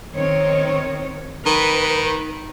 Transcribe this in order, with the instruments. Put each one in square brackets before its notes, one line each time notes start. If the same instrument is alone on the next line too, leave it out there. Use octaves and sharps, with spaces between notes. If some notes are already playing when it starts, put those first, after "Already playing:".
[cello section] D#3 C4 C#5
[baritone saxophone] D#3 [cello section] B4